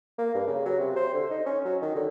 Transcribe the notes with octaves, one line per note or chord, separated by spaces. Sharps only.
A#3
G2
C#3
F#3
C3
C5
D3
D#4
C#4
F#3
D#3
D3